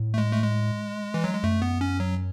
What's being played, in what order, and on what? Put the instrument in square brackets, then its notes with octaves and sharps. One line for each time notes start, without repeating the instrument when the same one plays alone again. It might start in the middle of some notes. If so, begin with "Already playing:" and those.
Already playing: [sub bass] A2
[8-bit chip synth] A3
G#3
A3
G#3
E3
F#3
G#3
[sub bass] F#2 [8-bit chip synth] A3
[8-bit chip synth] B3
C#4
F#3